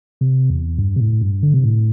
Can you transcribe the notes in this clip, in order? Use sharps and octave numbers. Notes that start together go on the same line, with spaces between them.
C3
E2
G2
C3
A2
G2
D3
C3
A2